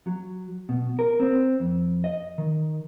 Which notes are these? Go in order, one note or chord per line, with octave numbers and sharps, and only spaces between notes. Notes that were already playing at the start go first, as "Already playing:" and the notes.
F#3
B2
A#4
C4
F2
D#5
D#3